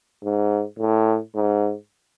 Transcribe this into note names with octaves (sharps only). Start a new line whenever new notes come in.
G#2
A2
G#2